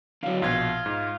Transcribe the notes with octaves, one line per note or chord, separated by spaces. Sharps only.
D3 F#3 F5
A#1 B2 F4 G#6
G#2